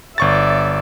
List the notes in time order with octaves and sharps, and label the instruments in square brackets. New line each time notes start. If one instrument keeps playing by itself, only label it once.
[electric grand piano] G1 C#6 A6 [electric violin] D5 E5